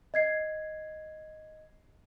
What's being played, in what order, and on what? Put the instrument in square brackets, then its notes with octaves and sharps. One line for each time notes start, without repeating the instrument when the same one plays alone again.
[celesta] D#5 G#6 C7